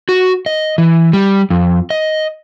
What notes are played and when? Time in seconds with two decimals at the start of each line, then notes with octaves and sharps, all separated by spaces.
0.09 F#4
0.46 D#5
0.78 E3
1.13 G3
1.50 F2
1.90 D#5